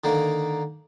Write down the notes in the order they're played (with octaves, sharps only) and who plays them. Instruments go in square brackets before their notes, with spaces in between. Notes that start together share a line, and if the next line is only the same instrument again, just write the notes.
[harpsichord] D3 D#3 A#3